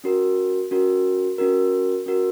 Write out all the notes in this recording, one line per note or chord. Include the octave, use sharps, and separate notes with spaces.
C#4 F#4 A#4
C#4 F#4 A#4
C#4 F#4 A#4
C#4 F#4 A#4